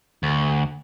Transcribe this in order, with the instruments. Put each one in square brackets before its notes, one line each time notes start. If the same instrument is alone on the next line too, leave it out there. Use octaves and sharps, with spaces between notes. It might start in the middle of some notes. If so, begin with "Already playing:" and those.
[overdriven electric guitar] D2